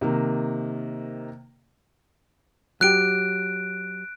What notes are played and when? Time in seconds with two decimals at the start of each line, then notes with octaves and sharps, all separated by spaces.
0.01 C3 D#3 A#3
2.81 F#3 G4 F#6 D7